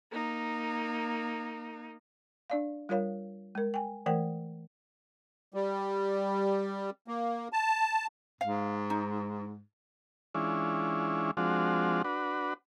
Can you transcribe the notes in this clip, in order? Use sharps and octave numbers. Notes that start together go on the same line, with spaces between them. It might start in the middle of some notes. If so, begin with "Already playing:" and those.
A#3 D#4
D4 D5 F5
G3 F4 A#4 C#5 F5
G#3 A#4
G5 G#5
E3 A3 A#4 C5 F#5 G5
G3
A#3
A5
G#2 F5
D#4
E3 G#3 C#4 D4 E4 F4
F3 G#3 C4 D4 F4 F#4
D4 F#4 B4